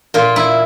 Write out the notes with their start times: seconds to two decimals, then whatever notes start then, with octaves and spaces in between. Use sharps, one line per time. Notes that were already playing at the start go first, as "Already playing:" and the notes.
0.14 A#2 F4
0.36 E4